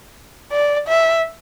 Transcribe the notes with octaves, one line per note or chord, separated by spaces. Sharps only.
D5
E5